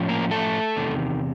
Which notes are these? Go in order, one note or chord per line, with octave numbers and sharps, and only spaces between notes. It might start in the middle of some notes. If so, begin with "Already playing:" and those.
Already playing: A2 F3 C#4
A#3 A#4
A3 A4
E2 C3 D#3